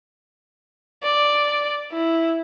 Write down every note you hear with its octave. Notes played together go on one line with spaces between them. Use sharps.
D5
E4